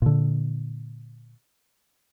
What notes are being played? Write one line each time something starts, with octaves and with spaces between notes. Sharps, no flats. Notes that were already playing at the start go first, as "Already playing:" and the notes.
A#2 D3